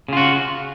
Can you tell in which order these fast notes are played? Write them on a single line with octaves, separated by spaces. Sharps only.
C#3 F4 F#4